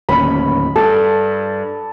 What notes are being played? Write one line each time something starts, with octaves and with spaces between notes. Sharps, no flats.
D1 D#2 C#4 B5
G2 A4